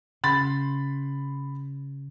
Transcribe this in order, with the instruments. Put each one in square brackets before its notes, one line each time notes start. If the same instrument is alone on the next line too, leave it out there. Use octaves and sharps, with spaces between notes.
[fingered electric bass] C#3 [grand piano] B5 C6 A6